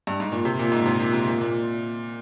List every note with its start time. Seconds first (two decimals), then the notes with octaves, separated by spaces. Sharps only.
0.07 G2
0.20 G#2
0.32 A#2
0.45 C3
0.59 A#2
0.72 G#2
0.86 C3
1.00 A#2
1.13 C3
1.27 A#2
1.41 A#2